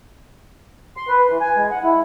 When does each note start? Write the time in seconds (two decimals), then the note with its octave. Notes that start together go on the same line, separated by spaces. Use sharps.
0.97 C6
1.08 B4
1.29 E3
1.41 G#5
1.56 G#3
1.71 F#5
1.83 E4